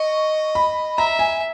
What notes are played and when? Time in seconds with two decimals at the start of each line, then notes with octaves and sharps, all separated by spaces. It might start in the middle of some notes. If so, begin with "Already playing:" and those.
Already playing: D#5 C#6
0.55 B5
0.98 E5 A#5
1.19 G#5